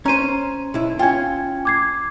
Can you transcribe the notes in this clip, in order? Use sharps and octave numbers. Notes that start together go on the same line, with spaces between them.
C#4 C5 A#5 D#7
B1 E4
C#4 F4 G5 G#5 G#6
D6 G#6 C7